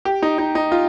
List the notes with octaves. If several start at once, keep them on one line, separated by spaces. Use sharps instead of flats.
G4
D#4
D#4
D#4
F4